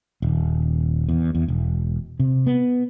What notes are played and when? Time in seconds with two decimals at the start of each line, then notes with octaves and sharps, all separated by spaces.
0.22 D#1
1.09 E2
1.35 E2
1.48 E1
2.19 C3
2.47 B3